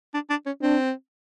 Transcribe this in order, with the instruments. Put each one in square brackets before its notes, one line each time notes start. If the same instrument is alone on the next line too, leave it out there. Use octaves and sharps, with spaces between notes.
[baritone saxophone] D4
D4
C#4
[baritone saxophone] C4 [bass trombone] D4